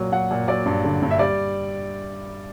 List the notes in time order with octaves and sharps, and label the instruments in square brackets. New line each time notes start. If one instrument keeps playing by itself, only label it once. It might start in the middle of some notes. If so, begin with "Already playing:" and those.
Already playing: [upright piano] A#2 F#3
F#3 F#5
A#2
F#3 D5
G2
D3
G2
E5
G3 D5